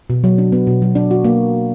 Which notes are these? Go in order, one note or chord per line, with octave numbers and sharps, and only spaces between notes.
B2
F#3
D4
B3
B2
F#3
D4
F#4
A#3